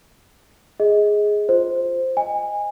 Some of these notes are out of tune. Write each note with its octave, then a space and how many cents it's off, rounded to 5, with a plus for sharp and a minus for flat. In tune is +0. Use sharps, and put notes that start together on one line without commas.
G#4 +0 D#5 +25
F4 +0 C5 +0
D#5 +0 G#5 -20